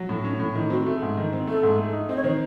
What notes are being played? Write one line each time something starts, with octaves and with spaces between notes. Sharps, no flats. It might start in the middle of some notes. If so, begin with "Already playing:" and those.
Already playing: F#3
A2
C#4 D#4
A2
D#3 E4
C4 F#4
A3 G#4
G#2
D#3
C4
A3 A4
G#2
A3
D#4
C4 D#5
C#5
D#3 C5